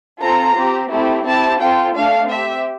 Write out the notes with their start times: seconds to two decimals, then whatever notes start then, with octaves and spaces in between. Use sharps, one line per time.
0.20 C4 F4 A4 A#5
0.55 C4 G4
0.90 A3 C4 E4 G4
1.25 C4 E4 G4 A5
1.60 C4 F4 A4 G5
1.95 A3 D4 A4 F5
2.30 C4 G4 E5